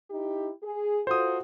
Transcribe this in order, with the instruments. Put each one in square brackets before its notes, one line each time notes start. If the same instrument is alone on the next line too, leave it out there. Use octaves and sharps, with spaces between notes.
[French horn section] D#4 E4 G4
G#4
[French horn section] F4 F#4 A4 [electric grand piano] C5 D#6